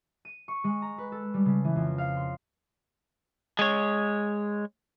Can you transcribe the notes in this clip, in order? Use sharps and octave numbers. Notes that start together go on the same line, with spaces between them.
D#7
C#6
G#3
A#5
B4
A4
G3
C#3
E3
F2
F5
C6
G#3 C#5